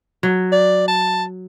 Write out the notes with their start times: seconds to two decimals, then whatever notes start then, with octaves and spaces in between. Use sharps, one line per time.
0.23 F#3
0.52 D5
0.88 A5